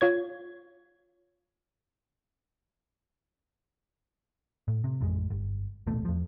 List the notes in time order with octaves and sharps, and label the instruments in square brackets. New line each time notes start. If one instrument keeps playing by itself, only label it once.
[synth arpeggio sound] F4 C#5 G#6
[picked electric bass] A2
C3
A1 F2 G#3
G1
D#1 A1 B2 A3
E2 F3